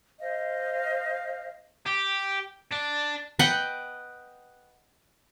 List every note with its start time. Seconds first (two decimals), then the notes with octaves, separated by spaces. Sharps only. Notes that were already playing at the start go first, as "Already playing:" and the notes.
0.20 C5 D#5 F5
1.86 G4
2.71 D4
3.39 B4 D#5 F#5 G5